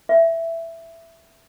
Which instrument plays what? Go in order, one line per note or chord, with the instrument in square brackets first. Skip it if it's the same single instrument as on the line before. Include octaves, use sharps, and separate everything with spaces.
[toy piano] E5